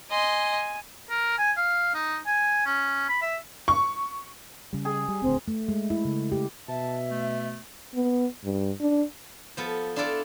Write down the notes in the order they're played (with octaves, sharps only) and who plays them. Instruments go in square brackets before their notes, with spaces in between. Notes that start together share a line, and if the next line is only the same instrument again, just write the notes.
[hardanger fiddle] D#5 C6 [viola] G#5
[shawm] A#4
G#5
F5
D#4
G#5
C#4
B5
E5
[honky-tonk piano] C#6
[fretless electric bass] C#3 G3
[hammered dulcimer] G#4
[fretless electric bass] G3
[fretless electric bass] D#1 D2 [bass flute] C4
[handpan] A3
G#3
E4
C#3
G4
[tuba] B2 [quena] E5 [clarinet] A5
[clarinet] A3
[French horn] B3
G2
D4
[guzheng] F3 B3 A4
D4 E4 F4 A4 D5